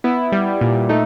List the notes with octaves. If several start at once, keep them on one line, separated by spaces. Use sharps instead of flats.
B3 E4
G3
A#2
A3 D#4